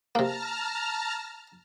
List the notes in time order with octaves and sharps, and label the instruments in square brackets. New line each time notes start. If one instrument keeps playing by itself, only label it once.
[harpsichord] C3 A#3 [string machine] A5 A#5 F6